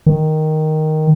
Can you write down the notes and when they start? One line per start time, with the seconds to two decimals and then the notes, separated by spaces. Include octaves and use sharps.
0.06 D#3